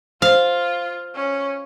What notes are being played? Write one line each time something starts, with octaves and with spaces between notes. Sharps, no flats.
F4 C5 F5
C#4